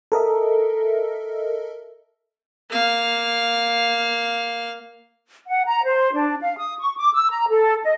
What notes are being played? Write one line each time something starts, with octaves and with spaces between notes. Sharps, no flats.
A4 A#4 D#5 E5
A#3 F5
F#5
A#5
C5
D4
F5
D#6
C#6
D6
E6
A#5
A4
D#5